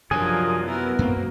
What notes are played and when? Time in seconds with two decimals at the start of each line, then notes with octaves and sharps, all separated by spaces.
0.11 F#2 C3 F3 F#3 D4 F4 G#4 A#4
0.64 F#3 B3 E4 A#4
0.99 F#2 A#3 C4 F#4